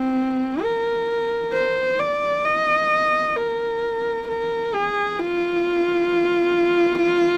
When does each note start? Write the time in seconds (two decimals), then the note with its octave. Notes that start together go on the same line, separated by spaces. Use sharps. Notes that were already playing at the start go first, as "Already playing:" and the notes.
Already playing: C4
0.62 A#4
1.53 C5
1.99 D5
2.45 D#5
3.36 A#4
4.28 A#4
4.74 G#4
5.20 F4